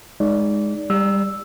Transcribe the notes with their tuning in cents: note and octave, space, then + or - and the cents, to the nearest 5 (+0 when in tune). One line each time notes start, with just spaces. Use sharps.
G#3 +0 D#4 +0 D5 -25
G3 +20 E6 +0